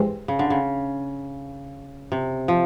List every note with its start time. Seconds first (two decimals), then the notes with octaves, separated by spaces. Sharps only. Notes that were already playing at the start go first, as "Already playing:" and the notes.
Already playing: G2 E3 G#3 C4
0.28 C#3
0.39 D3
0.50 C#3
2.12 C3
2.48 F3